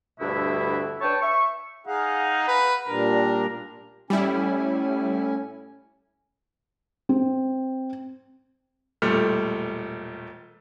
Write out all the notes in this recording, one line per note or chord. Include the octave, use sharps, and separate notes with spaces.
D2 G2 B2 D3 E4 E5
D4 B4 C#5 G5 A5
E5 C#6
D#4 G#4 F5 F#5
B4
A#2 G3 D4 A#4
A2 G3 C#4 E4 G#5
C4
E1 A#2 G3 A3 F6